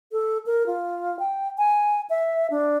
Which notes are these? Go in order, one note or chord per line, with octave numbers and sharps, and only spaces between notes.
A4
A#4
F4
G5
G#5
E5
D4